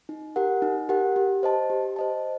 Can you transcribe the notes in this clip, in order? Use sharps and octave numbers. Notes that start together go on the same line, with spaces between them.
D#4
G4 A#4 F#5
D#4
G4 A#4 F#5
G4
C5 D#5 A5
G4
C5 D#5 A5